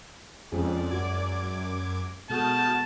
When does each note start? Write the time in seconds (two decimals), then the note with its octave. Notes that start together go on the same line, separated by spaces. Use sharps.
0.52 F2 G#3 C#4 G#4 D5
0.91 F#2 F#4 D6 G#6
2.30 B2 G#3 F#4 A4 A5 D#6 F6 G6